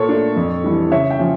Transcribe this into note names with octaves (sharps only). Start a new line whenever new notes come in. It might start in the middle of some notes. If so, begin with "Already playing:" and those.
Already playing: A#2 A4 C#5
A3 D4
F2
E3 G3 D4
C#3 C#5 E5
E5 G5
F3 C#4